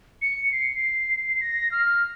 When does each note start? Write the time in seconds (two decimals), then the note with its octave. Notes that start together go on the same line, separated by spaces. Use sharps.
0.22 C#7
0.52 C7
1.41 A#6
1.71 F6